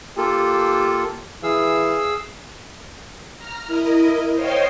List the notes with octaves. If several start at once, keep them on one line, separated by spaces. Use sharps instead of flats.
A#3 F4 G4 A4
E3 G#4 F5 E6
A#5 F6
E4 A#4 D#5
C5 C#5 D#5 F5 G5 C6